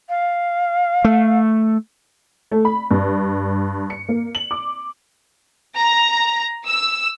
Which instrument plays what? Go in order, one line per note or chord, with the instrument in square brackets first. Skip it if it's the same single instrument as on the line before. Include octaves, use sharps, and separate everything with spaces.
[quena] F5
[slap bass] A3
[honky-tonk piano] A3
B5
G2
C#7
A#3
F#7
D6
[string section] A#5
E6